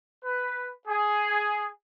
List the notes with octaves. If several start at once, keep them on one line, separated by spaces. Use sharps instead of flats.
B4
G#4